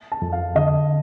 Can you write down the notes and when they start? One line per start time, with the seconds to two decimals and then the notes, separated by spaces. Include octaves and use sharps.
0.12 A5
0.22 F2
0.32 F5
0.55 D3 D#5